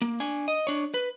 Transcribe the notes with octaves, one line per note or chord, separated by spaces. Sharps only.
A#3
D4 G#5
D#5
D4 C#5
B4